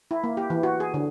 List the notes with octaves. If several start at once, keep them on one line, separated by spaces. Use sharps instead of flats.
E4
A#3
G4
E3
F#4
G#4
D3